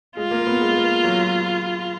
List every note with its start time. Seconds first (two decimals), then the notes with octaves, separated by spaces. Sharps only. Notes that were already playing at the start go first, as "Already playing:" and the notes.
0.17 G#3 F4
0.31 A#3
0.47 B3
0.61 G#3
0.75 A#3
1.04 F#3